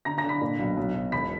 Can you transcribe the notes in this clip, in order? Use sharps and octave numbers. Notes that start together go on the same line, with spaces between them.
D3 A#5 A#6
A#5 A#6
D3
B5 B6
A#2
B1
B1
B1
E1 B5 B6